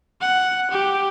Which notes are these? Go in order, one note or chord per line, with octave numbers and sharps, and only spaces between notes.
F#5
G4